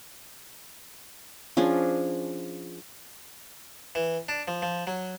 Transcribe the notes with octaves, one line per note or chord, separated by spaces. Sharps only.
F3 C#4 D4 G#4
E3
D4
F3
F3
F#3